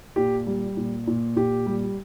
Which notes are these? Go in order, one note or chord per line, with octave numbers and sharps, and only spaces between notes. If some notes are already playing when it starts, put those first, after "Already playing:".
A#2 G4
G3
A#2
A#2
A#2 G4
G3